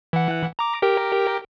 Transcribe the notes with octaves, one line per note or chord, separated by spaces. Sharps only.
E3 F#5
A#5 D6
G4 A#4 G5